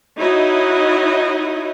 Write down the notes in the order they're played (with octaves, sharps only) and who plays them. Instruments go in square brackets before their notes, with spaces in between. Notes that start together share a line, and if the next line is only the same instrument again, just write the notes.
[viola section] D#4 E4 F#4 C#5 D#5